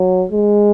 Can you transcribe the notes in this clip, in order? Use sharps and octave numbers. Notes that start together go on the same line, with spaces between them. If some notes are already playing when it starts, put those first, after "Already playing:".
Already playing: F#3
G#3